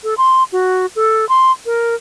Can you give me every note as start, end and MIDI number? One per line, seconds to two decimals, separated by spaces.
0.04 0.14 69
0.18 0.43 84
0.52 0.86 66
0.96 1.28 69
1.29 1.52 84
1.66 1.95 70